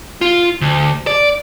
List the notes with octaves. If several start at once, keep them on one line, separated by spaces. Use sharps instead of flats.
F4
D2
D5